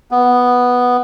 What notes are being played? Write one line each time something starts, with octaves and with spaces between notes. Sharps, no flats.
B3